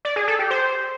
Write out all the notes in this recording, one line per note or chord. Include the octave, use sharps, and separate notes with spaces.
D5
G#4
A4
G4
C5